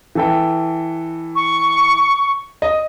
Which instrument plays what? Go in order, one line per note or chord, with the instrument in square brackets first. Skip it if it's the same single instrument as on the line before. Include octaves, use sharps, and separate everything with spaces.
[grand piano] E3 A4 G5
[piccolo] C#6
[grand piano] D#5